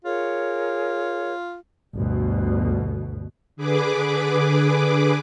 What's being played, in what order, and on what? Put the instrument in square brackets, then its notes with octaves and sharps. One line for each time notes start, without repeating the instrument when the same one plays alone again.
[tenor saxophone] F4 [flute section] G#4 A#4 C#5
[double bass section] G1 D2 B2
[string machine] D3 G#4 B4 D6